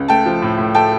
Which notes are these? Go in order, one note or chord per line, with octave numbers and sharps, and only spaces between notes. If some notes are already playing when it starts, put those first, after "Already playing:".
Already playing: C#2
A3 G5 A5
F3
A2
A2
A3 G5 A5